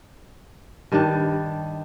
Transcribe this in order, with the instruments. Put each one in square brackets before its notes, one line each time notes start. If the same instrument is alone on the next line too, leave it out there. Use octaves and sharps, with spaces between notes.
[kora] G2 D#3 G3 D4